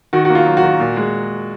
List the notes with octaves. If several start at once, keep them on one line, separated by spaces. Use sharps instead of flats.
D#3 F#4
A#3 F#4
F4
F#3
F#4
D#3
A#2
G#3